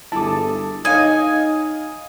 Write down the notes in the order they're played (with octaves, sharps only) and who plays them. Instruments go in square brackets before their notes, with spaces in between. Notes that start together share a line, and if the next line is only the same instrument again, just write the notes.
[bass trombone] G1 [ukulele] E4 G#4 A4 [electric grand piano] A5 D6
[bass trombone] D#4 [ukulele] C#5 D#5 [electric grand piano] F5 D#6 [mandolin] G#5